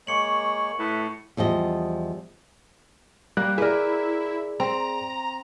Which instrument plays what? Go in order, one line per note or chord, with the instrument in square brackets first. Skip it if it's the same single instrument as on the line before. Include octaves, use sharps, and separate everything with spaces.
[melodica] G#3 A#3 C#5 [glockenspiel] C#6 C#7 F#7
[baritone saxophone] A2 [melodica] B4 E5
[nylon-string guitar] E2 F3 G3 D#5
[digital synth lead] G3 [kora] A#3 [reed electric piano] F#6
[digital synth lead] E4 [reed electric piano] G#4 D5 [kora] A#4 B4
[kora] C4 [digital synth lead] A#5